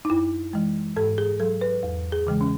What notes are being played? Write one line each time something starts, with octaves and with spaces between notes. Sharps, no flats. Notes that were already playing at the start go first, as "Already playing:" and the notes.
D#4
F#2 E4
E3 G#3
G#2 A4
G#4
F#3 A4
B4
E2
G#4
C#3 E3 G#3
C#4